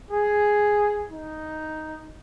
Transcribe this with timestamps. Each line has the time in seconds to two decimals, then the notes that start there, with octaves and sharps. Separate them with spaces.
0.11 G#4
1.10 D#4